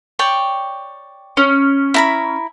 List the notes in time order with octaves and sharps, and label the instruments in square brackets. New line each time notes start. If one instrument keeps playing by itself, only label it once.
[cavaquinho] C#5 D5 G5
[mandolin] C#4
[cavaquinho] E4 A#5 B5